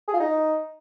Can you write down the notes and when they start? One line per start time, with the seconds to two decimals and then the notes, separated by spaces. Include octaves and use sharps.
0.08 G#4
0.14 F4
0.20 D#4